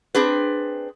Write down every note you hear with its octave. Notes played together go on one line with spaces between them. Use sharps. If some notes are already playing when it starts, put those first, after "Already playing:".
C4 D4 G#4 B4